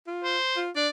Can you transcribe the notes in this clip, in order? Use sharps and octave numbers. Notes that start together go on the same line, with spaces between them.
F4
C5
F4
D4 D5